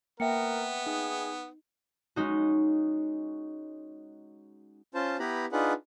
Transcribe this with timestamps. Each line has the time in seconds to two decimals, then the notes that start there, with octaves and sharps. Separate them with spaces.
0.20 A#3 B3 A#4 E5 G5 C#7
0.87 D#4 G#4
2.16 G#3 C#4 D#4 F#4
4.94 C#4 F4 C5 A5
5.19 B3 E4 G4 B4 A#5 B5
5.52 D4 D#4 F4 G#4 B4 F#5